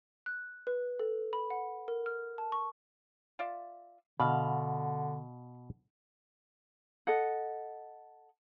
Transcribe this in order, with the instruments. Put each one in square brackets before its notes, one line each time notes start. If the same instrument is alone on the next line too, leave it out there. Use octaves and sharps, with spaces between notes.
[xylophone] F#6
B4
A4
B5
F#5
A#4
F6
A5
C#6
[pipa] F4 D5 E5
[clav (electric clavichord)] B2 [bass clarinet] D3 [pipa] D4 F5 B5
[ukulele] A4 D#5 F#5